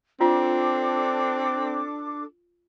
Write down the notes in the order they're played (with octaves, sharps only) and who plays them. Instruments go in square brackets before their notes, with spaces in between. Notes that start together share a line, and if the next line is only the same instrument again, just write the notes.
[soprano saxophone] C4 [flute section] D4 A4 D6 [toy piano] F4